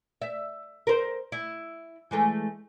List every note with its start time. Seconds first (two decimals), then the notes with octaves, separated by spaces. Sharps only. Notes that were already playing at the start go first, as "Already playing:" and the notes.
0.22 E5
0.87 A#4 C5
1.32 E4
2.11 E3 G#3 A3